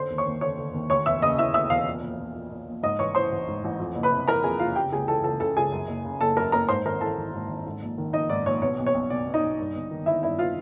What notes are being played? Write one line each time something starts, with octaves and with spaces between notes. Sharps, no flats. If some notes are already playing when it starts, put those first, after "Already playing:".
Already playing: D3 C5 C6
D#2
C#5 C#6
D#2
D3 C#5 C#6
D3
D#2
D2 C#5 C#6
E1 E5 E6
C#3 D#5 D#6
E3 E5 E6
D2 E5 E6
E1 F5 F6
A#2
A#1
A#1
A#2
A#2
A#1
G#2 D#5 D#6
A1 C#5 C#6
E3 C5 C6
A1
G#2
A1
F2
F#1
B4 B5
C3
E3 A#4 A#5
F2 G#4 G#5
F#1 F4 F5
C#3 G4 G5
C#2 G#4 G#5
E3 A4 A5
C#2 A4 A5
C#3 A4 A5
C#2 G#4 G#5
F#2
F#1
C#3
F#1 A4 A5
F#2 A#4 A#5
F#1 A#4 A#5
G#2 C5 C6
G#1 A#4 A#5
E3 A4 A5
G#1
G#2
G#1
G#2
A#1
D#3
A#1 D#4 D#5
G#2 D5
A#1 C#5
B2 C#5
B1
C#5
B1
B2 D5
B2
D#4 D#5
B1
G2
G1
D#3
G1 E4 E5
G2 E4 E5
F4 F5